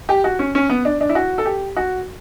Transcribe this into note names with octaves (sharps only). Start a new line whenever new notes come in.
G4
F#4
C#4
C#4
B3
D4
D4
E4
F#4
A4
G4
F#4